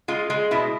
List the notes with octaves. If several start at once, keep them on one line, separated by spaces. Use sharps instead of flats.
G#3 F4
G#3
B2 E4